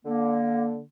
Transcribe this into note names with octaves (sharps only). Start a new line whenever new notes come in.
D3 A#3